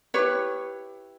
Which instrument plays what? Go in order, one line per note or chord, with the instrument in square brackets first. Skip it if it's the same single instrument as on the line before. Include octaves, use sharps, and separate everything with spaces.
[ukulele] E4 G4 B4 C#5